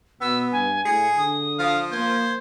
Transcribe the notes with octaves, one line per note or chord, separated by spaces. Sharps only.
B2 B3 E6
G2 G#5
A2 G#4 C#7
D3 D#6
F3 F5
A#3 C5 G#6